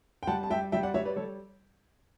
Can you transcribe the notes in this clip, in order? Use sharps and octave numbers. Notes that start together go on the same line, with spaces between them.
G5
G3 F#5 A5
A5
G3 E5 G5
G3 E5 G5
D5 F#5
G3 C#5 E5
B4 D5
G3 A4 C#5